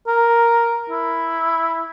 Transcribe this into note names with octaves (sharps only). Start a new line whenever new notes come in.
A#4
E4